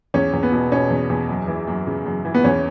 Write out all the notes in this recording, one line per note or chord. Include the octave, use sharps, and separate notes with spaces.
E2 C#4
E2
B3
B2
B2 C#4
E2
E2
F#2
E3
F#2
C#3
F#2
E3
B3
E2 C#4